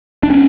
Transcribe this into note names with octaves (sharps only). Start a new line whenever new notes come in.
D4
B3 C#4